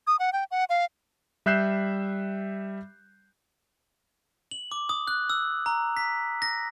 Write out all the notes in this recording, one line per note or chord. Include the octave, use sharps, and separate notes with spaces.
D#6
F#5
G5
F#5
F5
G3 E5 F#6 G6 C7 E7
F#7
D6
D#6
F#6
E6
A#5
B6
A#6